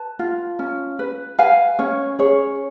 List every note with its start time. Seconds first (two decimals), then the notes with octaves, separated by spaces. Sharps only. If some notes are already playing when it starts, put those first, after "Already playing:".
Already playing: B4 A5
0.19 F4
0.59 C#4
0.99 B4
1.39 B4 F5 G#5
1.79 C#4 C#5
2.19 G#4 C#5